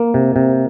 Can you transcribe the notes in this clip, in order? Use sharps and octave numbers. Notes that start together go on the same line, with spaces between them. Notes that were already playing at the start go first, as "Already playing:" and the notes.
Already playing: A#3
C3
C3